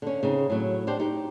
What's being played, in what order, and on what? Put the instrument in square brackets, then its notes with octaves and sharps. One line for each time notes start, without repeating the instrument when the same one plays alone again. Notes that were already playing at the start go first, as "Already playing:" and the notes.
[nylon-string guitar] D3 C#4
C#3 C4 D#4
A2 F#3
D4 F#4 G4 C5
D#4 G4